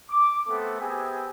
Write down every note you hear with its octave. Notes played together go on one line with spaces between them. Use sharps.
D6
A3 B3 C4 A4
B3 C4 G4 G#4 E5 G#5